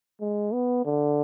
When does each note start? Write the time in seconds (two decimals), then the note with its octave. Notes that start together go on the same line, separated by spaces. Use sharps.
0.20 G#3
0.53 B3
0.85 D3